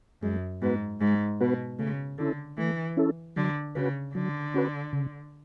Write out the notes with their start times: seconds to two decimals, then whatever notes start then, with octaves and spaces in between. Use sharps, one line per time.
0.22 F#2 G#3
0.62 G#2 B3 F#4 B4
1.01 G#2 G#3
1.40 B2 B3 F#4 B4
1.79 C#3 A3
2.18 D3 C#4 E4 A4
2.57 E3 A3
2.97 C#4 E4 A4
3.36 D3 F#3
3.75 C#3 C#4 F#4 B4
4.14 D3 F#3
4.54 C#4 F#4 B4
4.93 C#3